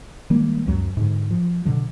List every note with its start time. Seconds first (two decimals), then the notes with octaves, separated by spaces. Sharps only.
0.30 D#3 G3 G#3 A#3
0.66 C#2 F#2 F#3
0.97 G#2 D3
1.31 F3
1.65 B2 D3 F#3